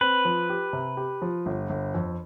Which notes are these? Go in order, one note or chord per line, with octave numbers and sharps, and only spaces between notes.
C4 B4
F3
G4
C3
G4
F3
G1
G1
F2